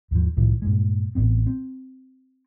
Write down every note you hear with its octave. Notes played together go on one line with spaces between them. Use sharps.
D#2 G#2 F3
C2 A2 D#3 F3
G2 A#2 G#3
A1 A2 B3 C4
C4